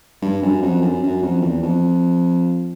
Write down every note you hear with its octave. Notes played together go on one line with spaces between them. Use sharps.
G2
F#2
F2
F#2
F#2
F2
E2
F2